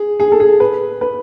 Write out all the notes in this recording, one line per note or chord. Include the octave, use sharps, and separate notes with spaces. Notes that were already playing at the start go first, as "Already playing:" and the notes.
Already playing: G#4
G#4
A4
G#4
B4
B4